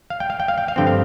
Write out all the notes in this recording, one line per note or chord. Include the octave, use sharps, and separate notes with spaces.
F5
G5
F5
G5
F5
G5
F5
G2 D3 F3 C4 G5
F5